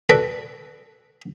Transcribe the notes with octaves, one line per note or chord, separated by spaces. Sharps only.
F#4 A4 B4 D5